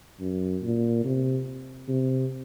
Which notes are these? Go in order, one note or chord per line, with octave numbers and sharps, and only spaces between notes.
F#2
A#2
C3
C3